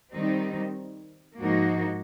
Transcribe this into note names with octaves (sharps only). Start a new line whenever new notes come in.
D#3 G3 C4 D#4
G#2 F3 A#3 D#4 F#4